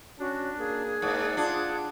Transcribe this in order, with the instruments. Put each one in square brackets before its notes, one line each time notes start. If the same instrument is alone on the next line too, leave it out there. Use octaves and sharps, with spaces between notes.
[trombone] C#4 [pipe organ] D4 [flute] F#4
[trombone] A#3 [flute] G#4
[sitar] G#2 [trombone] A#3 [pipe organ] D5 F#5
[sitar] D4 [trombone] F4